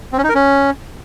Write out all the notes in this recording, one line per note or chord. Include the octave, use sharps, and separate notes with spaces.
C4
C#4
D#4
A#4
C#4